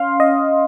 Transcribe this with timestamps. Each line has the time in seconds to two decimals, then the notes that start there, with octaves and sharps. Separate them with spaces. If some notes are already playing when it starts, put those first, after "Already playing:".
Already playing: C#4 F5 C6
0.20 D#5